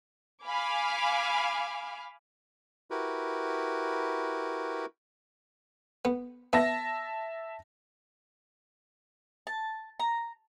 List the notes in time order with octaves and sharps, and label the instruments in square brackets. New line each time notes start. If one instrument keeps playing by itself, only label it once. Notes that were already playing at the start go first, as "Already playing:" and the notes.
[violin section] F5 G#5 B5 D6 F6
[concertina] E4 F#4 G4 A#4 B4
[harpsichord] B3
[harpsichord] B3 [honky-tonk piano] E5 A5 A#6
[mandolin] A5
A#5